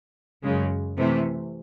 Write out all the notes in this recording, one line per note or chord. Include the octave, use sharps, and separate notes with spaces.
F#2 C#3 G#3
C3 E3 A3